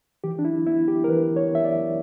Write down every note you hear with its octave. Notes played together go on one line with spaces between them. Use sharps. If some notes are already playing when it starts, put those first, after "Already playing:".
E3 G4
D4
E4
B3 E4
G4
A#4
E3 B4
C#5
B3 E5
D5